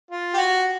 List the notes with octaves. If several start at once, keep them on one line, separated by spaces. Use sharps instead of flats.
F4
G4
F#4